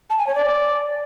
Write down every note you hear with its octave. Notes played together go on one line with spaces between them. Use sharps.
A5
G#5
C#5
D5